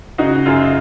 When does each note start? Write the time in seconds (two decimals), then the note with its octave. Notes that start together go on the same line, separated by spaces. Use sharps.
0.18 C#3 D#4 F#4
0.46 F#2 F4 G#4